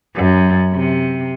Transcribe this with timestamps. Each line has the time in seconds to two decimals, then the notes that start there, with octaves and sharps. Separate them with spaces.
0.14 F#2
0.72 C3